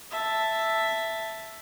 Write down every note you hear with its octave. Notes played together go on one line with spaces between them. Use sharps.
E5 A5